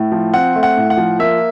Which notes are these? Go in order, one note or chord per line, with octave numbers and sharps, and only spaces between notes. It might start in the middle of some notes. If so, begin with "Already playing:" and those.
Already playing: A2
F3
C4 F#5
A3
F#5
A2
F#5
F3
A#3 E5